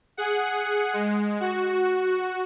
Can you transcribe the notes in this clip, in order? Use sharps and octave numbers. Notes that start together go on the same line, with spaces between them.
G#4 F#5
G#3
F#4